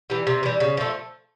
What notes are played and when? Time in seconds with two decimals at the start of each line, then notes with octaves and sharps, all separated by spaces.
0.10 E3 G3
0.27 C3
0.43 E3 G3
0.60 C#3
0.77 F3 A3